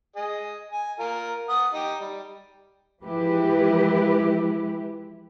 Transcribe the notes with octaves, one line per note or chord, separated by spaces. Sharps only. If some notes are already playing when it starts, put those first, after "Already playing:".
G#4 D#5
G#5
F4 A#4
F#5 D#6
D#4 G4
G3
E3 F3 G#3 E4 G4 B4